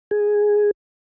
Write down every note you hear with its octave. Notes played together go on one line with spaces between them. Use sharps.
G#4